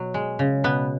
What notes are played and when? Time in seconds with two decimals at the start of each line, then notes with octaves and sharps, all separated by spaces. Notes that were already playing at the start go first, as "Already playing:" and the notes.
Already playing: B2 F#3
0.14 G#3
0.39 C#3
0.64 B2 B3